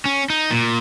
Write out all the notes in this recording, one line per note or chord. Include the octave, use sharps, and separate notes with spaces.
C#4
D#4
A#2